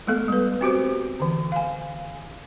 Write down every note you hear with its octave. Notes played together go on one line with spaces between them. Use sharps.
G#3 A3 B3 A4
G3 B4
C4 F#4 G4 C5
D3 E3
F5 G#5